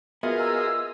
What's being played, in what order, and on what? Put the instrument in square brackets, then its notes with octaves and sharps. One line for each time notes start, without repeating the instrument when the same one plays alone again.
[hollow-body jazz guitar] B3 [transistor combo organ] F4 G#4 D#5 [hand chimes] F#4 A#4 E5
[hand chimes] A#5 [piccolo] E6